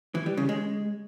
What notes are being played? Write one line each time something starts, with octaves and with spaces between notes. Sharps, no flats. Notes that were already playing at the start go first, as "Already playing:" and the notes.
E3
G3
C#3
G#3